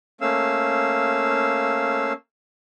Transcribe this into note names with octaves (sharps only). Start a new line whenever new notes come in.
A3 A#3 C#4 F5 E6